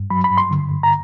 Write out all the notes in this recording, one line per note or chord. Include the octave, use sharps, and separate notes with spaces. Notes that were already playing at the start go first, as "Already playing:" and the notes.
Already playing: G2
F#3 B5
B5
G2
C6
D3
G2
A#5